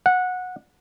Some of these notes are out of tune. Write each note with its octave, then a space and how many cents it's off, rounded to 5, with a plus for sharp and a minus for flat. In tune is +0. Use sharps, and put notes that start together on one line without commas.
F#5 -15